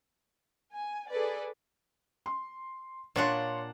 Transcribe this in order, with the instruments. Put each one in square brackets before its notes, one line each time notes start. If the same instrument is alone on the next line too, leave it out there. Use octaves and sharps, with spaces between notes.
[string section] G#5
G#4 A4 B4 D5
[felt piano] C6
[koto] A#2 D4 F#5 [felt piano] C#5 F5 C6